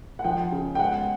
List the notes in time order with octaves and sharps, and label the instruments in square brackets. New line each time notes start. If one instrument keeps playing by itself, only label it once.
[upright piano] F#5
F3 G5
C#3
G5
G#3 F#5